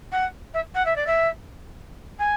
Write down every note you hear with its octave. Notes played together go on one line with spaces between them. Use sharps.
F#5
E5
F#5
E5
D5
E5
G#5